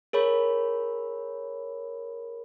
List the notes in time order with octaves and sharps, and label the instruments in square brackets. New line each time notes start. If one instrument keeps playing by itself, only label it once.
[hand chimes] G#4 A#4 C#5 B5